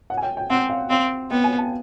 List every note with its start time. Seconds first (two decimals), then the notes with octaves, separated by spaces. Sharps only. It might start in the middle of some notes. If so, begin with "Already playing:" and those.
0.10 F#5
0.17 G#5
0.23 G5
0.37 G5
0.50 C4 F#5
0.70 F5
0.90 C4 F5
1.31 B3 G5
1.44 G#5
1.58 A5